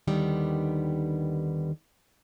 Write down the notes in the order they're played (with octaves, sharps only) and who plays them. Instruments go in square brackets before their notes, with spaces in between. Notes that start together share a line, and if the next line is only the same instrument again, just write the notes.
[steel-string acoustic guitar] D#2 D3 D#3 G3 B3